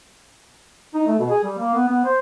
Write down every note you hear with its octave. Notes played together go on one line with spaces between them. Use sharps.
D#4
A3
B2
G#4
G3
A#3
B3
B3
C5